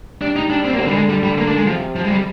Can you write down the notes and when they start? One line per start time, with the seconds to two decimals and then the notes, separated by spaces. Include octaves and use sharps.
0.22 G3 D4
0.36 D#4
0.50 G3 D4
0.65 C4
0.73 A#3
0.79 D3 C4
0.88 G3
0.95 G#3
1.09 G3
1.23 G3
1.38 A#3
1.47 D4
1.57 G#3
1.67 C3 F3
1.96 C3 F3
2.05 G#3
2.11 G3